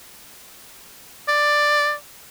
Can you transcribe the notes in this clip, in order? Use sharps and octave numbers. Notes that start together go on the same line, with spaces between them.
D5